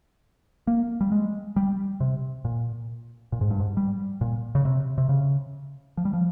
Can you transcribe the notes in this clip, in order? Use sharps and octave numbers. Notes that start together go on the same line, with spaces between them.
A#3
G3
G#3
G3
C3
A#2
A#2
G#2
G2
G#2
G3
A#2
C#3
C3
C3
C#3
F3
G3
F3